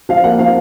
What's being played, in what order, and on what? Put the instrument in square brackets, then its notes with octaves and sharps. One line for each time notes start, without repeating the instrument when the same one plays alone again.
[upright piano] F3 F5
A#3 F#5
F3 F5